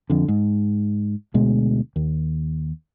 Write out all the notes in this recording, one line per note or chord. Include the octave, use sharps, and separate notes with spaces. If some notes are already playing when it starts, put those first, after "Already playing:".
F2 D3
G#2
D2 B2 G#3
D#2